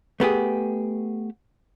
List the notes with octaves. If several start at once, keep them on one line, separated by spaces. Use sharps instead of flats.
A3 B3 G4 G#4